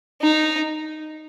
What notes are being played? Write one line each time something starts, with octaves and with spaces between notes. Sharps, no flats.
D#4